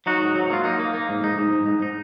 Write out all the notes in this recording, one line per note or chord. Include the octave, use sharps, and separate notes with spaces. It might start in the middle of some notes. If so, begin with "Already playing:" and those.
F#3 D#4 F#4
G#2
F#3
A#3 F4
A#3 D#4
A#3
A#3
G#2
G#2 D#4
G#2
G#2
G#2
D#4